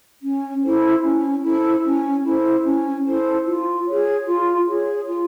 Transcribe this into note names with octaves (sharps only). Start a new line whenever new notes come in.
C#4
E4 A4 C5
C#4
E4 A4 C5
C#4
E4 A4 C5
C#4
E4 A4 C5
F4
G#4 C#5
F4
G#4 C#5
F4